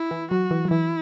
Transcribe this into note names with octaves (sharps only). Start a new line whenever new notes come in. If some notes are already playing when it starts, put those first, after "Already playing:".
Already playing: E4
E3
F#3 F#4
E3
F#3
E3 E4